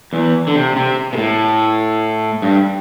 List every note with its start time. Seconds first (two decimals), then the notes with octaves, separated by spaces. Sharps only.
0.13 E2 E3
0.47 D3
0.55 C3
0.76 C3
1.13 B2
1.18 A2
2.42 G2